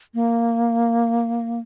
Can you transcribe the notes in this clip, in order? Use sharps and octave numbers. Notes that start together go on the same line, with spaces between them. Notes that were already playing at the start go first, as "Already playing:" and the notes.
A#3